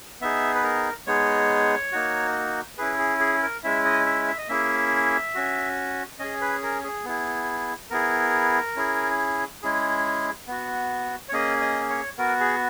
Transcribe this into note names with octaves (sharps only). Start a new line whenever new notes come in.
B3 D#4 G#4 E5
B4
A#4
G#3 B3 D#4 G#4 C#5
A#3 D#4 F#4
C#4 E4 G#4 B4
G#4
G#4
A#4
G#3 C#4 E4 E5
D#5
E5
E5
D#5
A#3 C#4 E4 G#4 E5
C#4 F#4
C#4 G#4 D#5
B4
A#4
G#4
B3 E4 G#4
B3 E4 G#4 A#4
C#4 E4 G#4
G#3 C#4 E4 G#4
B3 F#4
C#5
A#3 C#4 G#4 D#5
D#5
C#5
B3 F#4 A#4
G#4